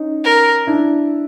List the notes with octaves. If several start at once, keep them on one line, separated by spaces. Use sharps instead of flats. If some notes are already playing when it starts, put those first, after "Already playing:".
Already playing: C#4 D#4
A#4
D4 E4